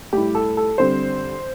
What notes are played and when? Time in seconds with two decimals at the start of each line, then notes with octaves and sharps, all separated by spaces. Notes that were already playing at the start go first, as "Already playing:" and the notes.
0.13 A2 G3 E4 G4
0.35 A4
0.57 A4
0.78 D3 G3 C4 C5